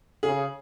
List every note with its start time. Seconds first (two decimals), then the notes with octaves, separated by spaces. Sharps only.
0.23 C#3 G#4